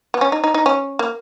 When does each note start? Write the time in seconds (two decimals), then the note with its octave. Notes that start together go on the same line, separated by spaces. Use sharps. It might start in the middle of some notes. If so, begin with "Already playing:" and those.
0.14 B3
0.21 C#4
0.32 D#4
0.44 D#4
0.54 D#4
0.66 C#4
0.99 A#3